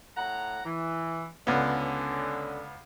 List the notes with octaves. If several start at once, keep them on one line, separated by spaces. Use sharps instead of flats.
A2 F#5 A#5
E3
C#2 D3 B3 C#4